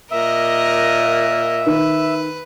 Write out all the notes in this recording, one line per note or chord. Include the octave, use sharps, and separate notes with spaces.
A#2 A#4 D#5 E5
D#3 B4